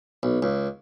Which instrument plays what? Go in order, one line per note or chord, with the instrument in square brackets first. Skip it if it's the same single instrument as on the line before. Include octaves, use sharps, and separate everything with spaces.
[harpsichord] B1
C#2